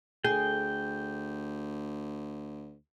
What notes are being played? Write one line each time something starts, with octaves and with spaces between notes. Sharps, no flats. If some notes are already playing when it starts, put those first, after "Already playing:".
D2 G#4 G5